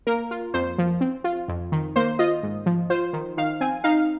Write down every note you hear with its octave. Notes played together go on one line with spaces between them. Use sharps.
A#3 A#4
F4
F2 C5
F3
C4
F4
F2
D#3
A#3 C5
F4 D#5
G#2
F3
F4 C5
D#3
D#3 F5
C4 G#5
D#4 F5